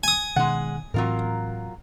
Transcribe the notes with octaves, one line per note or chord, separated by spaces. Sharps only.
G#5 D#6
B2 D#3 G#3 F#5
A2 E3 F#3 C4 F4 A#4